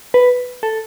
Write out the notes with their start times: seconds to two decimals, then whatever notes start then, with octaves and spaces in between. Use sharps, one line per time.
0.14 B4
0.63 A4